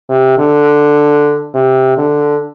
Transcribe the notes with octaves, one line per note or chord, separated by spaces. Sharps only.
C3
D3
C3
D3